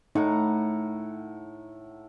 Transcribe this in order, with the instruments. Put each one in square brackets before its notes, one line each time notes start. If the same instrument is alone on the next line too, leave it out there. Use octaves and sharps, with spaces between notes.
[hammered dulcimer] A2 F#5 A#5 [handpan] D#4